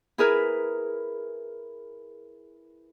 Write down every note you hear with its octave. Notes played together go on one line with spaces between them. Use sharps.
E4 G#4 A#4 B4